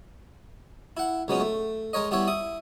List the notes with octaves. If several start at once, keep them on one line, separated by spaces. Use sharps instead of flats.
E4 F#5
C#2 F#3 G#3 B3 C#4
A3
G#3 A#4 C#5 D#5
G3 B3 E4 C#5
E4 D#6